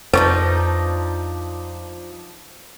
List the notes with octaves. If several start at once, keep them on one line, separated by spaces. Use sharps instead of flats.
F2 F3 D4 D#4 B4 C#6